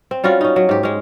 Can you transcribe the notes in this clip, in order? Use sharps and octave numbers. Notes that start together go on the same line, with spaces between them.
C4
G3 C#4 F4 F#4
C#4 D#4
F#3
G#2 G4
G#3 C#4